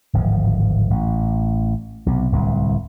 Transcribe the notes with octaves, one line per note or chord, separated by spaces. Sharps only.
D1 G#1 F3
A1
B1 C3
D1 C2